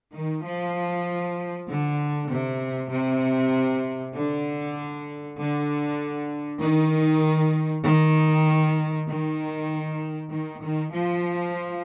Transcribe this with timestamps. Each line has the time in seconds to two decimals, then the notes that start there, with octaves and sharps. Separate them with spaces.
0.13 D#3
0.44 F3
1.68 D3
2.29 C3
2.91 C3
4.14 D3
5.37 D3
6.60 D#3
7.84 D#3
9.07 D#3
10.30 D#3
10.60 D#3
10.92 F3